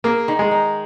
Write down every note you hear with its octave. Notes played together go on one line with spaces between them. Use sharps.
A#3 G#4
D#3
G#3
D#4